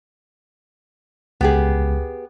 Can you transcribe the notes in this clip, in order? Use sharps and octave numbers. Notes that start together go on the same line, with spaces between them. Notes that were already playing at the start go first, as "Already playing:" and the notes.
C#2 B3 G4 G#4